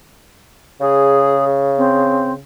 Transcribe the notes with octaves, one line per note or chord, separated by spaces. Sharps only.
C#3 G#4
C4